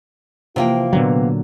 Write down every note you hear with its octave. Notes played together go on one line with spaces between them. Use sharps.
C3 E3 F3 A#3 F4 G5
A#2 D3 F#3 B3